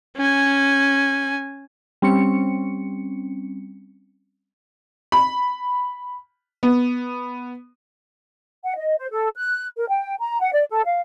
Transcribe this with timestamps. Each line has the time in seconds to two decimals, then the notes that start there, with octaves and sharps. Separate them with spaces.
0.17 C#4 G#5
2.02 G3 C4 C#4 C#7
5.12 B5
6.63 B3
8.63 F#5
8.76 D#5
8.97 C5
9.10 A4
9.37 F#6
9.76 A#4
9.89 G5
10.19 A#5
10.41 F#5
10.53 D5
10.69 A4
10.85 F5